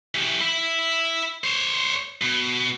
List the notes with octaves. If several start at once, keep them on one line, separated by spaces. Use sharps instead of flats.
E3 G4
E5 B5
C5 C#5
B2